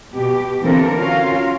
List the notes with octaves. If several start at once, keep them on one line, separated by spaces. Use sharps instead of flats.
B2 G4
D3 E3 A#3 C4 A4 A#4
C#4 F4 F#4 A#4 F5